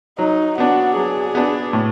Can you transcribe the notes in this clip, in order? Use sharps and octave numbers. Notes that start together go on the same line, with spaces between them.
F#3 D#4
B3 D4 F#4
F#3 G#4
B3 D4
A2